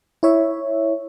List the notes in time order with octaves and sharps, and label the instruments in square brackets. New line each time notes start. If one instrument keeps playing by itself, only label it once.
[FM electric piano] E4 C#5 E5